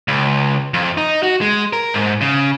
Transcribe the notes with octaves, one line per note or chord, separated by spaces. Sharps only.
C#2
F2
D#4
F#4
G#3
A#4
G#2
C#3